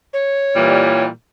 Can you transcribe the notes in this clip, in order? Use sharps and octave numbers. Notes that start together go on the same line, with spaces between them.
C#5
A#2 E3 G3